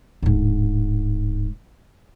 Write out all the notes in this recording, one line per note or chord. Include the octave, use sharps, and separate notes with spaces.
D1 G#2